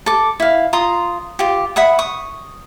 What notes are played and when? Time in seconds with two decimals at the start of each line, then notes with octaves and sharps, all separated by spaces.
0.06 A4 D6
0.40 E4 F5
0.73 F4 A#5 C6 D#6
1.39 F4 G4
1.76 E5 F#5 B5 D#6
1.99 C#6 D#6